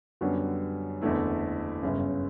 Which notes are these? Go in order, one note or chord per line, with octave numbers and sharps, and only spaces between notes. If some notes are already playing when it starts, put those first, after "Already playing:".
F#2 D3 G3 B3 F#4
F#1 E2 D3 A3 E4
G1 F#2 C#3